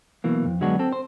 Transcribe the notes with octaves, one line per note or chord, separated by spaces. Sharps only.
B1 B2 E3 A#3
F2
D3 F#3 G#3 B3 D4 F#4
C4 A4
C5